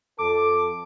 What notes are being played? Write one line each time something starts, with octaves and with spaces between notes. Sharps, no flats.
F2 A4 D6